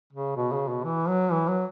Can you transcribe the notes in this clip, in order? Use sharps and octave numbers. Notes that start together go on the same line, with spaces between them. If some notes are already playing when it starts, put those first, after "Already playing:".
C#3
B2
C#3
B2
E3
F#3
E3
F#3